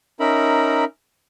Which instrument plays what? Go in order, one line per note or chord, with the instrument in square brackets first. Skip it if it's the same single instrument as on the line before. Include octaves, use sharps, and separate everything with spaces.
[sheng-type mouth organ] C#4 D#4 A#4 E5 A#5 B5